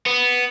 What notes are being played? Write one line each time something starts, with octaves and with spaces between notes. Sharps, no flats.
B3